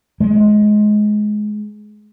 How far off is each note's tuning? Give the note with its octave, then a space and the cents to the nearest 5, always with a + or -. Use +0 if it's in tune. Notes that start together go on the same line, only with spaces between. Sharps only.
G#3 +20